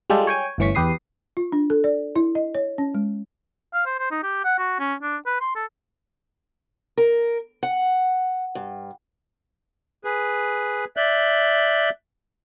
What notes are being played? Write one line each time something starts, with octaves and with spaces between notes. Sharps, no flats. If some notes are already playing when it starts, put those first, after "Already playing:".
G3 G#3 F4 G4 A4
C#5 G5 G#5
G1 A2 E3 C#4 C#6 B6
E2 G4 B4 D#6 C7
F4
D4
A4
D5
E4
D#5
C#5
C#4
G#3
F5
C5
C5
D#4
G4
F#5
F#4
C#4
D4
B4
C6
A4
A#4
F#5
G2
G#4 B4
D5 E5 F#6 G6